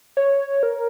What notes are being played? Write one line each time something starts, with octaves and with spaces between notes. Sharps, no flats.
C#5
A#4